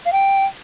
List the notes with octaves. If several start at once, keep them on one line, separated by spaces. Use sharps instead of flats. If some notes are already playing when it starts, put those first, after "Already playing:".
F5
G5